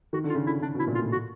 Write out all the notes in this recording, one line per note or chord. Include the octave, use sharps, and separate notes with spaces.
D#3 F#4
D3
F4
C#3
D3 E4
C#3 D4
B2 E4
A#2
F4
A2
F#4